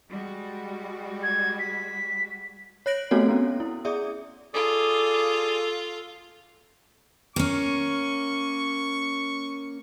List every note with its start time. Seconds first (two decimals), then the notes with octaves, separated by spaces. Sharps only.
0.10 G3 G#3 F#4
1.23 G#6
1.59 B6
2.86 C#5 F#6 A#6 D7 F#7
3.11 A3 B3 C4 F#4 A4 C#5
3.28 B3 C#4
3.60 E4
3.85 G#4 D5 E5 D#6
4.54 F4 G#4 A4 D5 D#6
7.36 A#3 C#4 C#6